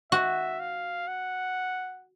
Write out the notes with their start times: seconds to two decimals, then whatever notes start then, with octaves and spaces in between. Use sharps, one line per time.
0.12 F#4 E5
0.60 F5
1.08 F#5